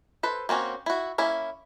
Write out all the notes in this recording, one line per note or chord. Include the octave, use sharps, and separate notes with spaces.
A4 B4 C5
A#3 C4 C#4 F#4
E4 F#4
A#3 C#4 E4